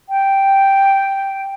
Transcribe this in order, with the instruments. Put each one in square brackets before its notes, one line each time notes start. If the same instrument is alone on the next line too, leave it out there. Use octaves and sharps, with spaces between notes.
[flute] G5